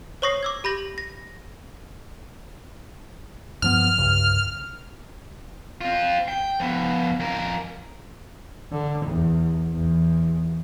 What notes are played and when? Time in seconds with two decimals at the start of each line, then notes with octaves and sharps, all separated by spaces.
0.22 C5 C#5 C#6 D#6 A#6 C7
0.43 D6 E6 G#6
0.64 G4 B5 G6 A#6 F#7
0.98 A#6
3.62 G2 F3 B3 F6
3.98 C2 G2 C#3
5.81 C4 F4
6.28 G5
6.60 F3 B3
7.20 F2 A#4
8.71 D3
9.06 E2
9.74 E2